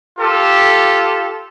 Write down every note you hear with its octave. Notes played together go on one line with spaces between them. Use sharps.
F4 G4 A4